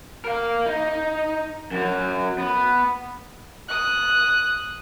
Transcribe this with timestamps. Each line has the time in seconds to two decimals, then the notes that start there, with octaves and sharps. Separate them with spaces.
0.25 A#4 F5
0.66 D#4
1.72 F#2 F#3
2.38 B3
3.69 D#6 F#6